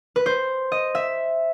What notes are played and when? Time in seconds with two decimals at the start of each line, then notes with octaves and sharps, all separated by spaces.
0.16 B4
0.26 C5
0.72 D#5
0.95 E5